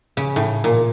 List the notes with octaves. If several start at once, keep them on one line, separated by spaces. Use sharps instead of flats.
C#3
A2
A#2